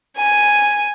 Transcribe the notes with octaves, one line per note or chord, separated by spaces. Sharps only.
G#5